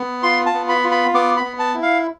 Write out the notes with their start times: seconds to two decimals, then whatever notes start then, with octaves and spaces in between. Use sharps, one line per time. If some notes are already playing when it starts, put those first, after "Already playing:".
Already playing: B3
0.23 F4 C6
0.46 A5
0.54 B3
0.69 B5
0.84 F4
0.91 B5
1.14 B3 D6
1.37 B5
1.44 B3
1.59 A5
1.74 E4
1.82 F5